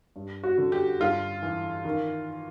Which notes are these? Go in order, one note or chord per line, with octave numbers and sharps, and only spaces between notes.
G2
F#4
D3
G4
G2 F4
E3
D#3